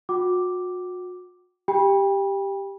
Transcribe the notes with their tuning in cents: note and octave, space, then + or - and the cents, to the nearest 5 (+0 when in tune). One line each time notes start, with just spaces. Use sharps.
F#4 -40 G5 -40 D6 +0
G4 +0 G5 +30 B5 -25